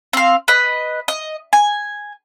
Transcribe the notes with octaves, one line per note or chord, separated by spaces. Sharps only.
C4 F5
B4 D#5
D#5
G#5